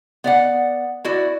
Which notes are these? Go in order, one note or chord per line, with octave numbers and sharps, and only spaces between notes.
B3 D5 F#5
E4 F#4 D5